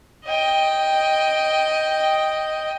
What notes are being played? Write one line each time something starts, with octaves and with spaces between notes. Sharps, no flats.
D#5 G5